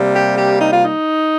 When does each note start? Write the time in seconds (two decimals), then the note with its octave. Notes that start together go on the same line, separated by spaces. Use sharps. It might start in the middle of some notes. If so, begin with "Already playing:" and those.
Already playing: C3 G3 A#3
0.14 G4
0.37 G4
0.58 D#4
0.71 F4
0.85 D#4